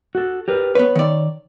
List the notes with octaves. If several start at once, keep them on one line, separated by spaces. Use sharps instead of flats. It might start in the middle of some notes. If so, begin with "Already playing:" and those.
F#4 A4
G4 A#4 B4
B3 B4 C#5
D#3 D5